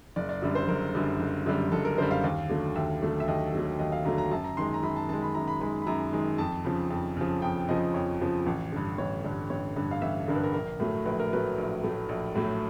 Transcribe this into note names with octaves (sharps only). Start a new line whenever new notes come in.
F#1 D5
D5
F#2 D3 G3
C5
F#1 A#4
F#2 D3 G3
F#1
F#2 D3 G3
F#1 A4
A#4
F#2 D3 G3 C5
F5
D#2 F5
D3 F#3 A3
D#2 E5
D3 F#3 A3
E5
D#2 D#5
D3 F#3 A3
D#2 D#5
F5
D3 F#3 A3 A#5
A#5
F#2 A5
A#5
D#3 G#3 C6
A#5
F#2 B5
A5
D#3 G#3 A5
B5
F#2 A#5
B5
D#3 G#3 B5
B5
F#2 A#5
D#3 G#3
F2 A5
C#3 F3
F2
C#3 F3
F2 G5
C#3 F3 D#5
F2 C#5
C#3 F3
A1
G2 D3
A1 C#5
G2 D3
A1 C#5
G2 D3
F5
A1 E5
G2 D3 A#4
B4
A#4
A#1 A#4
A2 F#3 A3
A#1 B4
A#4
A2 F#3 A3 B4
A#1
A2 F#3 A3
A#1
A2 F#3 A3